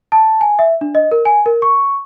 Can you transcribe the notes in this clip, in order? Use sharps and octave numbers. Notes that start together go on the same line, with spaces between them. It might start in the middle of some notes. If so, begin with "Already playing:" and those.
A5
G#5
E5
D4
D#5
A#4
G#5
A#4
C#6